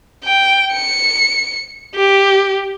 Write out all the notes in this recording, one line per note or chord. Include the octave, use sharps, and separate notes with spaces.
G5
C#7
G4